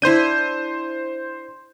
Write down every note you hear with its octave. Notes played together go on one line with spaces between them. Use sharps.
D4 E4 C5 G6 D#7